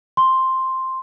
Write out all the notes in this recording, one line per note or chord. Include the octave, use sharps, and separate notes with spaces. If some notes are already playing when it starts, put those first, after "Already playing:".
C6